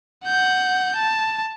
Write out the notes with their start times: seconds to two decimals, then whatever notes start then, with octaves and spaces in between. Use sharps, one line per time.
0.25 F#5 G6
0.96 A5